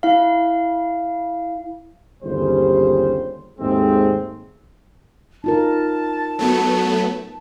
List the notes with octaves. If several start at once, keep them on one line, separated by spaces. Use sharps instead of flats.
E4 F5
G1 D#2 C#3 G3 C5
D#2 G#2 G#3 A3 C4
D#4 F4 A#4 A5
F#3 A3 B3